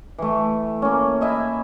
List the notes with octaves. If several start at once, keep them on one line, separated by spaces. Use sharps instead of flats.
E3 A3
A#3 C#4
E4 D#5 E5